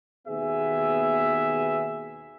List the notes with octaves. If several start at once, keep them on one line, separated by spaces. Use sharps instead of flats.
D#2 B2 B3 G#4 E5